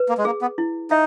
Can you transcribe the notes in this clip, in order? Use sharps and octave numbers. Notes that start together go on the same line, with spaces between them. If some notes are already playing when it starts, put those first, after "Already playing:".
Already playing: B4
A#3
G#3
A#3 G#4
B3
E4
D#4 E5